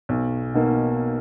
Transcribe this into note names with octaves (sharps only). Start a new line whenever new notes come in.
B1
B2 A#3 D#4